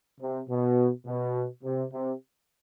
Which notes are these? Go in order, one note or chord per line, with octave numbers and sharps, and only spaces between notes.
C3
B2
B2
C3
C3